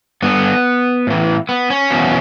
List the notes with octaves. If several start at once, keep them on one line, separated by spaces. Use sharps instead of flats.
G2 D3 B3
A2 E3
B3
C#4
E2 B2